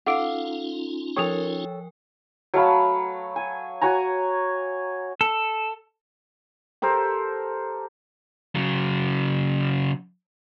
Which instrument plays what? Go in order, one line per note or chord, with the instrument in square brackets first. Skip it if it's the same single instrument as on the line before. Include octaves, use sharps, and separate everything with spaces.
[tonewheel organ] C#4 D#4 F4 [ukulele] A4 F5 [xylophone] F#5 D6 D7
[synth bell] F3 A#4 G5 [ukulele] A4 C#5 [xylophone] C#6 D#6 F7
[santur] F#3 A3 F5 B5
G#5
F#4 C#5 G#5 A#5
[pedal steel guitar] A4
[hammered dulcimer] G4 A4 A#4 C5
[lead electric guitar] C#3 F#3